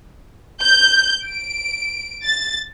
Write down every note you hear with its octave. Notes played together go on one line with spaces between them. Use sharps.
G6
D7
A6